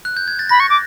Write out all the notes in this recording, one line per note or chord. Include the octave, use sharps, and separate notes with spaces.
F#6
G6
G#6
A6
B5 A#6
C#6
D6